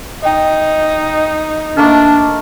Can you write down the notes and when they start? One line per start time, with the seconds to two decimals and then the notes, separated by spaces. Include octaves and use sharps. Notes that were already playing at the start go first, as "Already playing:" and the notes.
0.22 D#4 D#5 G5
1.77 A3 A#3 D4 D#5 F5 A5 F6